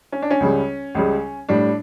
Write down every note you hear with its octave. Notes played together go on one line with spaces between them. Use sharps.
C#4
D4
C#4
C#2 C#3 G3
C#2 C#3 G3
A2 G3 D4